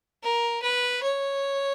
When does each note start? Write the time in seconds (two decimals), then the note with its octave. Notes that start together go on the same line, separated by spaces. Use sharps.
0.23 A#4
0.62 B4
1.03 C#5